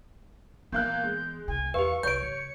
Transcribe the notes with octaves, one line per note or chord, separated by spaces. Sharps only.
A#2 E3 A#3 B3 F#6 G6
G#3
C2 A3 G#5
E2 G4 B4 F5 C#6
C2 C#5 C#6 G6 D7
C#3 C#7